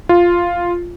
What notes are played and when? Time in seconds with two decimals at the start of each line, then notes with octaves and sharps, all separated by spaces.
0.09 F4